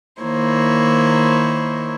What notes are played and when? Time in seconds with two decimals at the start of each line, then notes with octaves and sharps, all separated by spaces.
0.21 D#3 A#3 E4 C5 C#5